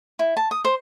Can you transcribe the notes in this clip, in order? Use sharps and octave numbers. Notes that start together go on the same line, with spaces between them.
E4
A5
D#6
C5